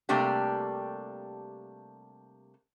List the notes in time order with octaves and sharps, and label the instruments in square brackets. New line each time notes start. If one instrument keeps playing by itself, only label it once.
[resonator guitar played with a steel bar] C3 G3 A3 A#3 D4 G4